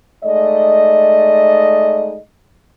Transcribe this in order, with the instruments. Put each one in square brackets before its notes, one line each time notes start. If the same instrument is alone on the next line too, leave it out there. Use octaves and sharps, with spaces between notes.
[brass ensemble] G#3 A3 D#4 D5 D#5